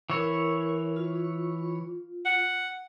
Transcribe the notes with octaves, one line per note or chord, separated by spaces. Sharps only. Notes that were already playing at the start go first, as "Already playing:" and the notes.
E3 E4 A#4 C#5
F4
F#5